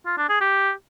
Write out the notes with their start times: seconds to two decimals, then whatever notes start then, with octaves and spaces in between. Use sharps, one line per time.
0.06 F4
0.18 D4
0.29 G#4
0.41 G4